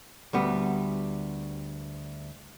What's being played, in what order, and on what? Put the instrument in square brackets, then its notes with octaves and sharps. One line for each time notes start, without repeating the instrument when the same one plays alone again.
[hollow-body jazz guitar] D2 G3 B3